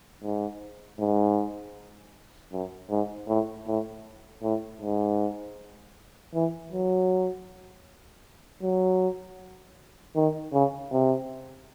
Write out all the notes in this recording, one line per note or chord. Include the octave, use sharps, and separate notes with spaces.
G#2
G#2
F#2
G#2
A2
A2
A2
G#2
E3
F#3
F#3
D#3
C#3
C3